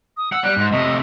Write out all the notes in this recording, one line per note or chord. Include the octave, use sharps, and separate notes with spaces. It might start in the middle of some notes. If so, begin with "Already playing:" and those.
D#6
F#5 E6
G3 F#6
G#2
C3 A3 D#5